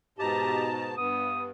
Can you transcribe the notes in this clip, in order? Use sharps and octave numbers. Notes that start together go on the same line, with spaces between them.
G#2 B2 G4 D#5 A5 A#5
G2 B3 D#6